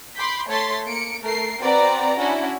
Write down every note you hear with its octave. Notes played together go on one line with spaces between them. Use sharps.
B5 C6 D6 G6 B6
A3 C#5 A5 C6 A6 B6
A#3 C#7 D7
A3 A#4 C7
C4 F#4 B4 D5 A#5
C#4 D4 E4 F#4